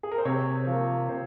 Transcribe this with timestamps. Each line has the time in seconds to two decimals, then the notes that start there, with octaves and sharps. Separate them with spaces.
0.03 G#4
0.12 A#4
0.18 C5
0.25 C3 C#5
0.66 F3
0.72 A#3
1.09 C3 C5